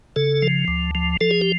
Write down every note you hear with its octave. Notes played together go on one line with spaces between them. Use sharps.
C#3 A4
F3
D2
F3
F3 A4
G#4
G4